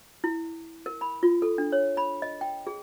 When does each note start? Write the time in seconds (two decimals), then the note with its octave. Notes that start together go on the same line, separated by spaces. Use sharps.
0.24 E4
0.86 A#4
1.01 B5
1.23 F4
1.42 A4
1.58 D4
1.72 C#5
1.97 B5
2.22 D#5
2.41 G5
2.67 G#4